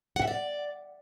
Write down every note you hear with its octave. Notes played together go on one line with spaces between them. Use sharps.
F#5
E5
D5